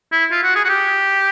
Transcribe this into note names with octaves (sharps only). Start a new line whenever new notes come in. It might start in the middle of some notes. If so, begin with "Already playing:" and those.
E4
F4
F#4
G#4
F#4
G4